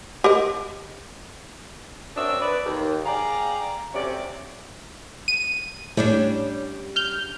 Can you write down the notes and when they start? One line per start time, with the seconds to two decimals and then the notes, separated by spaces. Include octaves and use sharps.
0.24 G4 A#4 D#5
2.17 F#2 C4 D4 C#6 D#6 E6
2.42 B4 D5
2.66 D#2
3.06 G#4 D5 F5 G5 A#5
3.94 D2 C3 C#4 D5
5.28 D#7
5.97 A2 G3 C#4 D4
6.96 F6 G6